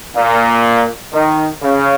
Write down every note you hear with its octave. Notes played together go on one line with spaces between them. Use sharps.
A#2
D#3
C#3